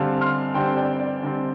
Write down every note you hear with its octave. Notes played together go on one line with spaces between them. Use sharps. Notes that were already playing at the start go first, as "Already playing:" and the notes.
Already playing: D3 G3 C4 F5 A5
C6 F6
D3 G3 C4 G5 C6
D5 G5
D5
D3 G3 C4